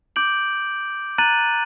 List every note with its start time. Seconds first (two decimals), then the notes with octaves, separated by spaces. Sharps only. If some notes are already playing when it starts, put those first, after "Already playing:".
0.16 D6 G6 D7 F#7
1.18 A#5 F#6 A6 D#7 F#7